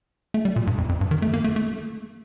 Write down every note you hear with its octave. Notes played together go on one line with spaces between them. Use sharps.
A3
G3
A#2
G2
F2
F2
G2
D#3
A3
A#3
A3
A3